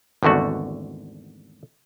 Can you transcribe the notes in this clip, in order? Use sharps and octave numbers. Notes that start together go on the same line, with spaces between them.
G#1 E2 D3 A3 F#4